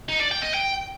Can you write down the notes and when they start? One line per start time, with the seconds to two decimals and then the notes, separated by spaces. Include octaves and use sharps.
0.09 D#4
0.20 D5
0.31 G5
0.42 D#5
0.54 G5